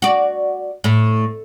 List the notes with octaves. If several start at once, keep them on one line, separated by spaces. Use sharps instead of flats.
F#4 D5
A2